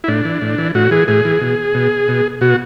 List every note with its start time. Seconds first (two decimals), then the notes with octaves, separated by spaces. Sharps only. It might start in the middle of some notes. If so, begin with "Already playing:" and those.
0.04 E4
0.08 A2 D4
0.25 E3
0.42 A2
0.58 E3
0.74 A2 F#4
0.91 E3 G#4
1.08 A2 G#4
1.25 E3
1.41 B2
1.74 B2
2.08 B2
2.41 B2 F#4